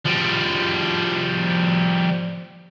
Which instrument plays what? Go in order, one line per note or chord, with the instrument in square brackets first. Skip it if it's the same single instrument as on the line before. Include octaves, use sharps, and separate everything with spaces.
[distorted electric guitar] F3 G3